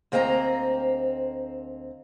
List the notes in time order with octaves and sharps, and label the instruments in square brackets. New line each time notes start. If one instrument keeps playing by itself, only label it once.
[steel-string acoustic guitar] D2 A#3 C4 D#5 E5 A#5